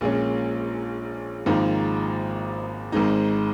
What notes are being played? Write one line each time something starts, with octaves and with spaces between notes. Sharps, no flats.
A#1 A#2 G#3 C#4
G#1 G#2 F3 A#3 D#4
G#1 G#2 G#3 D#4